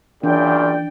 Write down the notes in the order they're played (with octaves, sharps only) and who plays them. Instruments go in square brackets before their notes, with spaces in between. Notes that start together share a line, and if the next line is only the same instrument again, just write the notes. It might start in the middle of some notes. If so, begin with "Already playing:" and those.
[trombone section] F#2 A#2 C#3 [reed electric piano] E3 [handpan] D4 [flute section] D5 G5